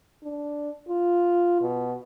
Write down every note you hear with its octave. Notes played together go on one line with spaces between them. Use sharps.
D4
F4
B2